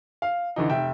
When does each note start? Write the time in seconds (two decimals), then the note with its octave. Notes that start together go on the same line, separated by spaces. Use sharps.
0.22 F5
0.56 D3 E3 D#4
0.70 F1 E5 G5